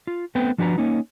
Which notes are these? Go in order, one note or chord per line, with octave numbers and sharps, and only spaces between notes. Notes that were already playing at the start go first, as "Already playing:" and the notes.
F4
A3 B3 C4 B4 G5
F3 D4 F#4 B4 A#5
A#3 C#4 D#4